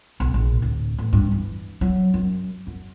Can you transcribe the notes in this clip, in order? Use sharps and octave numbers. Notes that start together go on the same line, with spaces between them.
B1
A#1
D1
A1
G2
E3
F#3
F#2
F#2